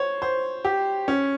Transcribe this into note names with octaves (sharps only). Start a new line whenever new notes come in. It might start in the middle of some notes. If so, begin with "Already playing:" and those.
Already playing: C5 C#5
C5
G4
C#4